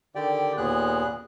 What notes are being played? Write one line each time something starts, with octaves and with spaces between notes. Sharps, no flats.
D3 D#3 G4 D5 G5
D#2 A#2 B3 G#4 F#6